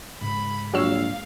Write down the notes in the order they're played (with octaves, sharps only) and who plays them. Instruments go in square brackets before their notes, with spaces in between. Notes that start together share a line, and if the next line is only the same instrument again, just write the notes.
[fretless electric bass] G#2 C#3 [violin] B5
[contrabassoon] A#1 [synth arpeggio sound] F#3 C#5 E6 [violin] F5